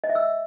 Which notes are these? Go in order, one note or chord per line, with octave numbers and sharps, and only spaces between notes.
D#5
E5
E6